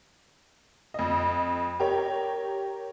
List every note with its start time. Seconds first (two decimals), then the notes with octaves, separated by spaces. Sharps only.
0.94 F2 D#5
1.80 G4 A#4 C#5